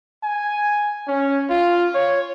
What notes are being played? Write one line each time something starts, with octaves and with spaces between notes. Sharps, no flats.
G#5
C#4
F4
C#5